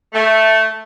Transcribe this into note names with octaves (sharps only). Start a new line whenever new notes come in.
A3